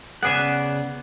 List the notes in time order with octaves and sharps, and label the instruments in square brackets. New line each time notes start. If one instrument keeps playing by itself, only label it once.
[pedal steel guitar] C#3 D5 F#5 [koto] B3 G#4 E5